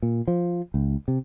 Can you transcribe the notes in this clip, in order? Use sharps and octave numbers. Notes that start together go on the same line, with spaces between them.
A#2
F3
C#2
C3